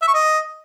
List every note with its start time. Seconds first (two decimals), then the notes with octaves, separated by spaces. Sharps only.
0.02 E5
0.08 C#6
0.14 D#5